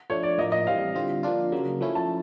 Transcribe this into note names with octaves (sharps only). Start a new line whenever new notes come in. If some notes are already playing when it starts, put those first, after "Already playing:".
F3 A3 D4 C#5
D5
A2 F3 A#3 D#5
D#5
E3 G3 C4 F5
D3 G3 C4 F4
F3 A#3 D4 F4
C#3 F#3 A#3
F3 A3 C#4 E4
A5